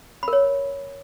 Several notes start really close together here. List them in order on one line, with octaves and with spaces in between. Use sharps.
B5 A#4 C#5